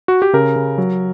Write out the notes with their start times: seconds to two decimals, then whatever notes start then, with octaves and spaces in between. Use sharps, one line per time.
0.08 F#4
0.22 G4
0.33 C#3 A#4
0.56 C#3
0.78 F#3